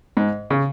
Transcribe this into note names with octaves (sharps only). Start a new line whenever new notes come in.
G#2
C#3